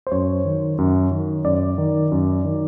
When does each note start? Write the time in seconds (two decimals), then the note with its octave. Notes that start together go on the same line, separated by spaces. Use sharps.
0.07 C5
0.11 F#2 C#5
0.45 D#3
0.78 F#2
1.11 D#3
1.44 F#2 D5
1.78 D#3
2.12 F#2
2.45 D#3